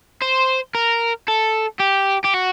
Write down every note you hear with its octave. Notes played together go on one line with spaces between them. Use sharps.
C5
A#4
A4
G4
G4
F#4